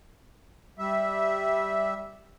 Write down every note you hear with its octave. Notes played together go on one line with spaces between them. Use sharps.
G3 E5